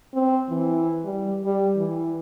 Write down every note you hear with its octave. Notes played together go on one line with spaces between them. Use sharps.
C4
E3
G3
G3
E3